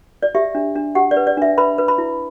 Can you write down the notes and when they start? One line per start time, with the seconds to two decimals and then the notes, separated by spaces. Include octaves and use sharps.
0.23 D5
0.35 G4 E5
0.55 D4
0.75 D4
0.95 G4 F#5
1.11 D5
1.16 B4
1.27 D5
1.37 D4 E5
1.58 B4 B5
1.78 B4
1.88 B5
1.98 E4